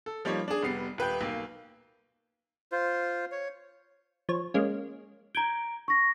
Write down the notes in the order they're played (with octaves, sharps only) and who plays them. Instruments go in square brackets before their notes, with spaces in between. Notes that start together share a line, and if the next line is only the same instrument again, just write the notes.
[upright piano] A4
F3 G3 A#3 D#4 C#5
D4 G#4
F1 G3 B3 C7
D#1 B4 G5 G6
B1 A#3
[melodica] F4 C5
C#5
[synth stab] F3 C#5
G#3 A#3 C#4
[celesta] A#5 D7 [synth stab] G6 G#6
[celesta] C#6 A#6